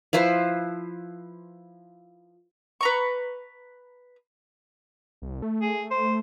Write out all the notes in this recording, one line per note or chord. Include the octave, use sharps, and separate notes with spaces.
F3 E4 B4 C5
B4 A#5 C#6
C2
A3
G#4
C5